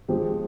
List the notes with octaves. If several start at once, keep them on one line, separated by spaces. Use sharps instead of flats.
F3 G#3 C4 G4